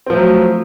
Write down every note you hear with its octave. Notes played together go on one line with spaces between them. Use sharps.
F3 F#3 A3 C4